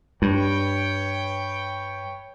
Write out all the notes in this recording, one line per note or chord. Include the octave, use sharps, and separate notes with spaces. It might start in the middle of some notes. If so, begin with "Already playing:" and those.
G2 B4 C#5 G5